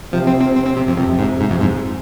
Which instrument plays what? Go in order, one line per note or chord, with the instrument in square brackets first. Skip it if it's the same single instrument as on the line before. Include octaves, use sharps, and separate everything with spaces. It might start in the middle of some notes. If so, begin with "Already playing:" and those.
[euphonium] C3 [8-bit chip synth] F3
[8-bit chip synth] C4
C4
C4
C4
C3
F2
[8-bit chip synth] F2 [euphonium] C3
[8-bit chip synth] G#2
[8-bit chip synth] G#2 [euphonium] C3
[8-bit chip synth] F2
G#2